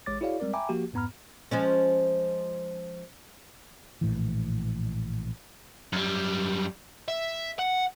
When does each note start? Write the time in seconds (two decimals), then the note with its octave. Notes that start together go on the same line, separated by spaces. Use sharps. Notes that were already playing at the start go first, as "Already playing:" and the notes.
0.06 A1 G#3 C#5 D6 A6
0.21 E4 F#4 G#4 C#5 D5 F5
0.40 G3 G#3 C4 A#4 D5
0.53 E5 G5 G#5 A#5 B5 D6
0.69 F3 A#3 F#4 G4
0.93 F2 G#2 B3 A#5 B5 F6
1.51 F3 G#3 C#4
4.01 A#1 A2 E3
5.93 F#2 G3
7.08 E5
7.59 F#5